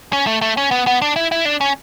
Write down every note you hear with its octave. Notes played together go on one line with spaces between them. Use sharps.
C#4
A3
A3
C#4
B3
B3
D4
E4
E4
D4
C#4